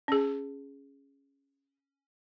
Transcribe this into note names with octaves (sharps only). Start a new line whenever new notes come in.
C#4 G#4